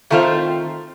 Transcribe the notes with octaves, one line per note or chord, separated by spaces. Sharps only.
D#3 A3 C4 F4 C5